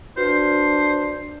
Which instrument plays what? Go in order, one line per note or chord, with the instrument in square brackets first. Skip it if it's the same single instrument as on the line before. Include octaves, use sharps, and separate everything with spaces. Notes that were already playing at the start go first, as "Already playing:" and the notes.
[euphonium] D4 [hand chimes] F#4 B4 [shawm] C5